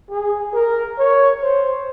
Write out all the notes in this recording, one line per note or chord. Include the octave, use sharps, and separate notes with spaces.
G#4
A#4
C#5
C5